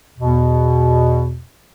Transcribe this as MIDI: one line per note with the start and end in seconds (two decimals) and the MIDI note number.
0.18 1.41 40
0.18 1.41 47